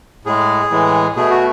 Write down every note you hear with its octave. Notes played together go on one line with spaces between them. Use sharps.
A2 G#3 G#4
A2 E3 G#3
B2 A3 G#4
F#4